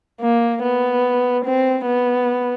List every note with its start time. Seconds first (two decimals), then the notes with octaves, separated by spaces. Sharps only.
0.21 A#3
0.63 B3
1.45 C4
1.86 B3